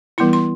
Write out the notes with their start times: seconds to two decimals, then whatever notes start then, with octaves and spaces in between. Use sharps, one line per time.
0.18 E3 G3 B3 E4 C6
0.33 C6